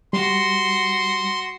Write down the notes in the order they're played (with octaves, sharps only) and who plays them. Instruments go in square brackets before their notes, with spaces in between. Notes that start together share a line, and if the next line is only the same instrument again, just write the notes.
[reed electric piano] G3 [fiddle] F#4 [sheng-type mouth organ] C6